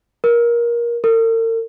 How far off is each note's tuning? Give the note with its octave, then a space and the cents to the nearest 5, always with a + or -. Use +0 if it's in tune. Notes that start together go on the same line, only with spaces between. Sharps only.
A#4 +20
A#4 -45